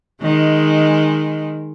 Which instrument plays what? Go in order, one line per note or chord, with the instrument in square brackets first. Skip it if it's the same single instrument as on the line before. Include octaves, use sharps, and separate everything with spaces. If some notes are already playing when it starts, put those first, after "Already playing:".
[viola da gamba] D#3 G#3